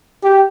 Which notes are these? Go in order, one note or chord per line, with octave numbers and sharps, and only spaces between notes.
G4